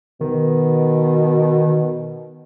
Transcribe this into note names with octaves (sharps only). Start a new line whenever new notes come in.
B2 D#3